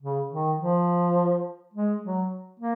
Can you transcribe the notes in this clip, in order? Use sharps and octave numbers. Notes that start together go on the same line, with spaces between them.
C#3
D#3
F3
G#3
F#3
A#3